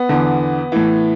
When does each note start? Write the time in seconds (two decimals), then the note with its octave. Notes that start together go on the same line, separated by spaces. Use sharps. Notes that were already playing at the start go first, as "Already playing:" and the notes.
Already playing: B3
0.09 E2 D3
0.72 A2 E3